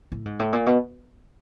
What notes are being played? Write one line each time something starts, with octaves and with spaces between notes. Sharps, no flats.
A2
G#2
A2
A#2
B2